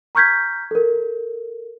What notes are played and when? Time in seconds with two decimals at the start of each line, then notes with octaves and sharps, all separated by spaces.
0.15 A#5 C#6 F6 G6 G#6 B6
0.71 A4 A#4